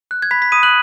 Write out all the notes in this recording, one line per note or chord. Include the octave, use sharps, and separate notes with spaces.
F#6
G#6
B5 B6
B6
B5 D#6 D#7
F#6 F#7